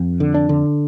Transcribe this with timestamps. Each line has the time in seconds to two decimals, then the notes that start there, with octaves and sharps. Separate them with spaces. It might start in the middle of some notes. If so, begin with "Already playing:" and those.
Already playing: F2
0.20 D3
0.34 D4
0.49 D3